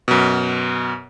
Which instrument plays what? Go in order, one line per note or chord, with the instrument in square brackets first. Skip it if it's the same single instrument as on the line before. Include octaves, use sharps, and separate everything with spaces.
[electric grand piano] F#2 B2